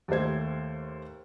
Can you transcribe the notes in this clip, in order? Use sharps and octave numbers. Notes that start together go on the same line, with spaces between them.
D#2 A3 G4 C5 G#6